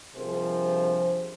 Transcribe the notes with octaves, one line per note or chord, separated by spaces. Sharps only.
G2 C3 F3 G#4 A#4 C5